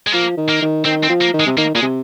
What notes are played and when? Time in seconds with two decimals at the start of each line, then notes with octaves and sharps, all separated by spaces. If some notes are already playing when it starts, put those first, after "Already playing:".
0.07 G#3
0.13 F3 A#3
0.37 D#3
0.49 A#3
0.62 D#3
0.85 D#3 C4
1.04 C4
1.09 F3
1.21 A#3
1.34 D#3
1.40 G#3
1.46 C3
1.58 D#3 A#3
1.74 A#2 G#3
1.82 C3